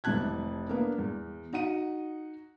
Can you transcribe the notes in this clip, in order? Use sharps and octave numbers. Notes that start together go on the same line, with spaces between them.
F1 C3 E3 A5 F#6 G#6
A#3 B3 D4
E2
D#4 F#4 F#5 D#7